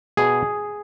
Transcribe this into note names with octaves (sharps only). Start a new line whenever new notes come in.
B2 G#4